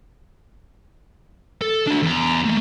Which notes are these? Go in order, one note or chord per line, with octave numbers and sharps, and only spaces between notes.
A4
D4 F#4
E2 A#5
A3 A#3